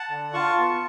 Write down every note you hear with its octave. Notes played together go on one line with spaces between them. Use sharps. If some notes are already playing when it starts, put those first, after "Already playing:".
Already playing: F#5 A5
D3
F4 A5 C#6
B3